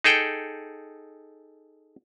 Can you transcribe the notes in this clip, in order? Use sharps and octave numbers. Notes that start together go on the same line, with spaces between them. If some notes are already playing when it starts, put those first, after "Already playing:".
D#4 G#4 A4 G5